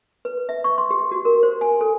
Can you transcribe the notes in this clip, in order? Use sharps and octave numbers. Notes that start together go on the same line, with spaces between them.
B4
E5
C#6
C6
G4
F#4
A#4
C5
G#5
A4